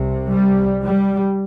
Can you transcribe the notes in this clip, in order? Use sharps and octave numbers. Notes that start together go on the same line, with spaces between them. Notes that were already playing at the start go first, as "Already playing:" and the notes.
Already playing: C2 C3
G3
G3